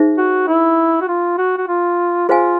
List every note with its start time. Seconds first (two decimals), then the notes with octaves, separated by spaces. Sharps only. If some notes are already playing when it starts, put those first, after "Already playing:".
Already playing: D#4 G#4 C5 E5
0.18 F#4
0.48 E4
1.02 F#4
1.08 F4
1.38 F#4
1.58 F#4
1.68 F4
2.28 F4 G#4 C5 F5 G#5